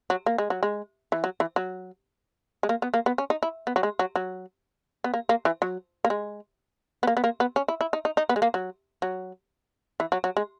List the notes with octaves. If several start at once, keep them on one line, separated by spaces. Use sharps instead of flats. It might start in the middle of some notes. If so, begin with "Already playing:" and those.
F#3
A#3
G#3
F#3
G#3
E3
F#3
E3
F#3
G#3
A#3
B3
A#3
B3
C#4
D#4
E4
B3
F#3
G#3
F#3
F#3
B3
A#3
A#3
E3
F#3
A#3
G#3
B3
A#3
B3
A#3
B3
C#4
E4
E4
D#4
D#4
D#4
B3
G#3
A#3
F#3
F#3
E3
F#3
F#3
G#3